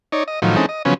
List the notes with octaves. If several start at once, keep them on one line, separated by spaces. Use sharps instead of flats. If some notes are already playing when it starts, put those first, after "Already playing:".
D#4 C#5 D5
D#5
A2 D#3 F3 F#3
E3 G#3 C4 C#4 D#4 A4
D#5
C#3 F3 F#3 B3 C#4